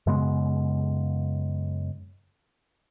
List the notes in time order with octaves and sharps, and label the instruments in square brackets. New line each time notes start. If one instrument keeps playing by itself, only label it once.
[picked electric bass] F#2 C#3 G#3 B3